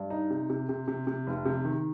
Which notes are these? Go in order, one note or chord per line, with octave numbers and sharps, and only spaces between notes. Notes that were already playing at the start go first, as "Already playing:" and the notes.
Already playing: G2
D#4
C3
C3
C3
C3
C3
F1
C3
D#3